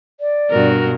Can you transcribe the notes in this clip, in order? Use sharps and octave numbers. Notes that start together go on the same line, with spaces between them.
D5
G2 B2 F#4 A#4